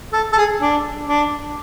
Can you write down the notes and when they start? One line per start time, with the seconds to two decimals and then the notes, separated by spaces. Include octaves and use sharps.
0.13 A4
0.33 A4
0.37 G#4
0.61 D4
1.07 D4